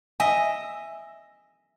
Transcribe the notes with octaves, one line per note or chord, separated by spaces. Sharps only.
D#5 E5 G#5